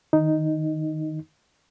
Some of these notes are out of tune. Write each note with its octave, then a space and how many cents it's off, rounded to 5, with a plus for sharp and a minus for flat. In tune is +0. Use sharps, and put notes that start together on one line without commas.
D#3 +0 D#4 +0